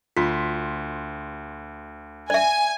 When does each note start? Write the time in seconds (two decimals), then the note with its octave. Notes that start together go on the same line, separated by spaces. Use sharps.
0.17 D2 F4 C6 B6
2.30 D5 E5 G#5